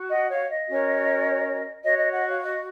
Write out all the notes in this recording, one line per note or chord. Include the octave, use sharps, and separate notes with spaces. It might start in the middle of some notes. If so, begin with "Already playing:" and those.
Already playing: F#4
D#5 F#5
C#5 F5
D#5
C#4 F#4 A#4 C#5
F#4 C#5 D#5
D#5
D#5 F#5
C#5 F5
D#5